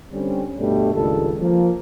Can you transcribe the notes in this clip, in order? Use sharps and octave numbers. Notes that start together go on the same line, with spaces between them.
D3 G3 C4 C#4
G2 B2 G3 A3
C#2 G2 D#3 G3 A4
F3 A#3